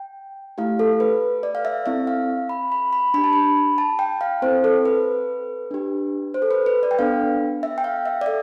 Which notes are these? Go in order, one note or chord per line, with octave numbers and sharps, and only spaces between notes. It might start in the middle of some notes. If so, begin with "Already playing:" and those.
Already playing: G5
A3 E4 G4 F5
A4
B4
D5
F5
E5
C4 E4 A4 E5
F5
B5
B5
B5
D4 G4 B5
A5
B5
A5
G5
F5
C4 E4 A4 C5
A4
B4
D4 G4
C5
A4
B4
B4
D5
G5
B3 D4 A4 F5
E5
G5
F5
E5
D5
A4 E5